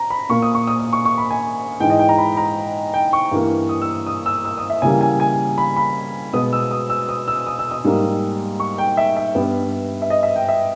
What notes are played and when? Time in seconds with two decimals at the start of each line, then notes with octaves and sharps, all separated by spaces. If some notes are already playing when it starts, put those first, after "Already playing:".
Already playing: A#5
0.10 B5
0.29 A#2 A#3 C#6
0.42 D#6
0.55 C#6
0.67 D#6
0.80 D#6
0.93 C#6
1.05 C#6
1.18 B5
1.31 G#5
1.80 G#2 E3 G#3 G5
1.90 D#5
1.99 G5
2.09 A#5
2.18 B5
2.37 A#5
2.94 G5
3.13 C#6
3.31 G2 E3 A#3
3.69 D#6
3.82 E6
4.07 D#6
4.26 E6
4.45 E6
4.57 D#6
4.70 E5
4.82 C#3 E3 G3 A#3 G#5
5.01 G#5
5.20 G#5
5.58 B5
5.76 B5
6.33 B2 G#3 B3 D#6
6.53 E6
6.71 D#6
6.90 E6
7.09 D#6
7.28 E6
7.47 D#6
7.59 E6
7.71 D#6
7.84 G#2 G3 A#3
8.60 C#6
8.78 G5
8.97 E5
9.17 E5
9.35 G2 G3 B3
10.02 E5
10.10 D#5
10.23 E5
10.36 G5
10.49 E5